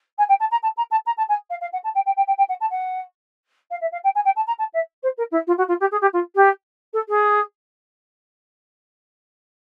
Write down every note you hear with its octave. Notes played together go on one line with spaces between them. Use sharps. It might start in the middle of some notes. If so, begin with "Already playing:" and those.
G#5
G5
A5
A#5
A5
A#5
A5
A#5
A5
G#5
F5
F5
F#5
A5
G5
G5
G5
G5
G5
F#5
A5
F#5
F5
E5
F5
G5
G#5
G5
A5
A#5
A5
E5
C5
A#4
E4
F4
F#4
F4
G4
G#4
G4
F4
G4
A4
G#4